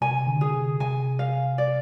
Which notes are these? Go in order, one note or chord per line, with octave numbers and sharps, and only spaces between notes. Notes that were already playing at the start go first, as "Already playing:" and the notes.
C3 G#5
D3
G#4
C3
C3 G#5
F5
D5